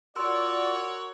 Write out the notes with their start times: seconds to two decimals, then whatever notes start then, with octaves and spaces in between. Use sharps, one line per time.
0.16 F4 F#4 A#4 C#5 D5 C6 E6